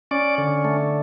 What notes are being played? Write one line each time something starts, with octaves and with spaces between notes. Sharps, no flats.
C#4 D5
D3
A3